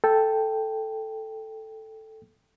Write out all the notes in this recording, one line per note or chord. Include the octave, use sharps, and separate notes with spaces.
A4 G5